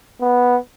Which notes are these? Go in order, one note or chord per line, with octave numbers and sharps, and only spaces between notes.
B3